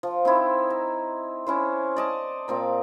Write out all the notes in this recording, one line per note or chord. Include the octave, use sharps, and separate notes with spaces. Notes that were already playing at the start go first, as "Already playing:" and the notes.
F3
C4 D#4 E4
A#5
C#4 E4 C5
D5 D#5 A5
A#2 C4 A#5